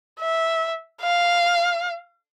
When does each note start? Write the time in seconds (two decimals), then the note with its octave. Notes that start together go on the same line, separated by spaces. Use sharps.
0.20 E5
1.02 F5